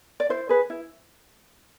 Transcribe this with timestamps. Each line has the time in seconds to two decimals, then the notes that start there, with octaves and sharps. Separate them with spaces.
0.20 D5
0.29 E4 C5
0.49 G#4 B4
0.70 E4